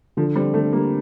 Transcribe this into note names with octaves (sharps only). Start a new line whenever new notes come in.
D3 F3
G3 C4
D3 A3
G3 A#3